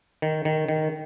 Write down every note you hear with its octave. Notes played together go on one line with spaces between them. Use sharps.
D#3
D#3
D#3